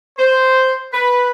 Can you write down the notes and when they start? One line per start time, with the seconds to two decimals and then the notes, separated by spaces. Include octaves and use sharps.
0.18 C5
0.93 B4